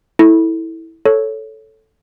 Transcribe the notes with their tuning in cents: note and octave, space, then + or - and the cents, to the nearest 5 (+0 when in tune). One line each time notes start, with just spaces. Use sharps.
E4 -15 A4 +0
A4 +0 C#5 +0